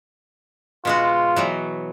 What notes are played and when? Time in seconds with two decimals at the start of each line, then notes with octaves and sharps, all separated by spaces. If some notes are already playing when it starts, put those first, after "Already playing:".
0.85 B2 G#3 F4 F#4
1.36 B2 E3 F#3